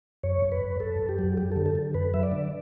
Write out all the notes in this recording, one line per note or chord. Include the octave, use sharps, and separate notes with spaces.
F#2 C#5
F#2
B4
F#2
F#2 A4
F#2
G4
F#3
F#2 G4
D3 A4
A4
D3
F#2 B4
F#3 E5
D5
D3